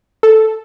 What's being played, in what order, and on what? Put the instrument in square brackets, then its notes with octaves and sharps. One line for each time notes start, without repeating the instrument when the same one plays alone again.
[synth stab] A4